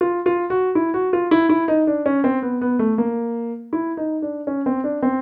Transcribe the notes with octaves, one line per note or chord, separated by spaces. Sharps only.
F4
F4
F#4
E4
F#4
F4
E4
E4
D#4
D4
C#4
C4
B3
B3
A3
A#3
E4
D#4
D4
C#4
C4
D4
C4